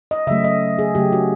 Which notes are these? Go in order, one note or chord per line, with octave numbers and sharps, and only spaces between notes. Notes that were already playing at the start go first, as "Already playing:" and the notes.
D#5
C#3 F#3 A3 E5
D#5
G#4
C#3 F#3 A3 G4
F#4